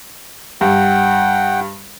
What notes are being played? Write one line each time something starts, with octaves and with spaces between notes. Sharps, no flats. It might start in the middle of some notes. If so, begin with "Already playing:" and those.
G2 F#5 G5